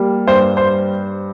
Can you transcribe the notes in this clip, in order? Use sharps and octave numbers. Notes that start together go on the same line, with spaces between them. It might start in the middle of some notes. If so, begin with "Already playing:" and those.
Already playing: G3 A#3
G2 C5
C5